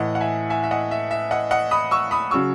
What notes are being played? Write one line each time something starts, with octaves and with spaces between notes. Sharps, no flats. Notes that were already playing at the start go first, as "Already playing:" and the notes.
Already playing: A2 E3 D#5 F#5
F#5
E5 G#5
E5 G#5
E5
D#5 F#5
E5
E5
D#5 F#5
D#5 F#5
B5 D#6
C#6 E6
B5 D#6
C#3 F#3 C#6 E6